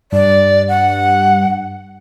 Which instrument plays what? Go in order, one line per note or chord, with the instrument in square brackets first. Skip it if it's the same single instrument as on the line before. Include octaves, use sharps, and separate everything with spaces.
[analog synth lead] G2 [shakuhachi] D5
[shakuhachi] F#5